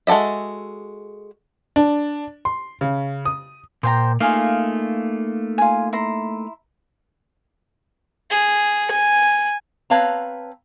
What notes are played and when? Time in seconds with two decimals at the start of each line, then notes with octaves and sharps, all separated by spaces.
0.07 G#3 F#4 A4 D#5 E5
1.76 D4
2.45 C6
2.81 C#3
3.25 D#6
3.83 A#2 C5 G5 A#5
4.20 A3 A#3 D#4 F4 G#4 F5
5.58 F4 G#5
5.93 E4 A#5 C6
8.30 G#4
8.91 G#5
9.90 C4 B4 C#5 F5 A5 A#5